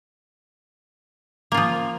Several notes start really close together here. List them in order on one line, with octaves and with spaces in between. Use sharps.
A#3 F4 F3